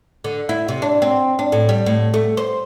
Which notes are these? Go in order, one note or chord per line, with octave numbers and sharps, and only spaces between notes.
D3
E4
C3
D4
C4
D4
A2
G3
A2
A3
C5